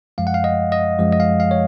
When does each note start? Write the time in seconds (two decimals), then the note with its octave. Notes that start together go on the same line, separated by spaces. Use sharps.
0.18 F#2 F3 G#3 F5
0.27 F#5
0.34 F5
0.44 D#5
0.72 D#5
0.99 F#2 F3 G#3
1.13 D#5
1.20 F5
1.40 F5
1.51 C#5